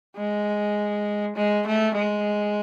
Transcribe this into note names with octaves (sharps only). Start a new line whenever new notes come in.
G#3
G#3
A3
G#3